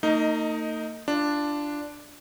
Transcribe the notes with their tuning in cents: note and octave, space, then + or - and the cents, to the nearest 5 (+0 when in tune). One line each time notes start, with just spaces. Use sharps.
A#3 -45 D#4 +0 D#5 +15
D4 +0 F4 -25